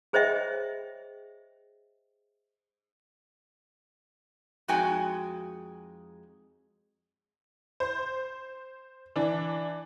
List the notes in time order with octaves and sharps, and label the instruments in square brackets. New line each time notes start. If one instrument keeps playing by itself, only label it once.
[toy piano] G#4 C5 C#5 D#5 E5 G5
[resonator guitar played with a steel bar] F2 G#3 D#4 F#4 G5 G#5
[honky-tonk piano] C5
E3 D4